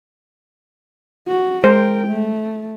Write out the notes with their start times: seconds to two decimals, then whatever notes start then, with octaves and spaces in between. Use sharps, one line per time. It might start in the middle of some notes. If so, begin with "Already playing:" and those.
1.28 F#4
1.64 G#3 A#4 C5 G5
2.08 A3